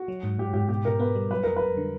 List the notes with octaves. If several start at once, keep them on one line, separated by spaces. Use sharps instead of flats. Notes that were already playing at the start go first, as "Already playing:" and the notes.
Already playing: F#4
F#3
G#2
G#2 G4
G#2 G4
B2 G4
B2 A#4
B3 B4
G3
F#3 B4
F2 A#4
F2 B4
D3